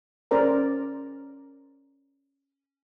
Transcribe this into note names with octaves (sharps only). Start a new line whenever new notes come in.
C#4 G#4 A#4 C5 D5 A#5